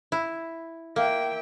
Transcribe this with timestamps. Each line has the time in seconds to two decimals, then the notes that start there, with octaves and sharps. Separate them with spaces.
0.12 E4
0.96 A#3 E5 G5